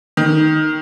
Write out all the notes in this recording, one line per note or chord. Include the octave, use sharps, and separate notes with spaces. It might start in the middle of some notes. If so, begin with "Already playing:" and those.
D#3